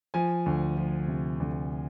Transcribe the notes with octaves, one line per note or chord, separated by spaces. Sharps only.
F3 G#5
D2
F3
C3
D2